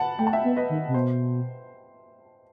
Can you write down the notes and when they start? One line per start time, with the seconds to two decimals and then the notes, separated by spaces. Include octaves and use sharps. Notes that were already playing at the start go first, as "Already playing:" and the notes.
Already playing: F#5 A5 B5
0.19 A3 G5
0.27 A5
0.33 E5 G5
0.44 B3
0.56 B4 D#5
0.70 D#3
0.88 C3
0.94 B2 C5